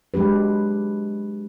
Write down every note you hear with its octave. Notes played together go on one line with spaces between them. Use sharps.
F#3 G#3 D4 G4 B4